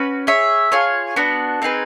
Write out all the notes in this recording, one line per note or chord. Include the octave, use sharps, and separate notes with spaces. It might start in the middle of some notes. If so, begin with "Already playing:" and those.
Already playing: C#4 F#4 B4
G#4 C#5 E5
F4 G#4 C#5
B3 D4 F#4
C4 D#4 G#4 B4